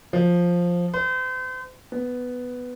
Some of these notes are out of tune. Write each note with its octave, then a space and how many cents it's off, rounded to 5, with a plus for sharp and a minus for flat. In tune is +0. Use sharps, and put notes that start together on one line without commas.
F3 +5
C5 -40
B3 +5